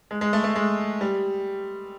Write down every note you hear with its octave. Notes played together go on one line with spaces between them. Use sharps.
G#3
G#3
A3
A3
G#3
G3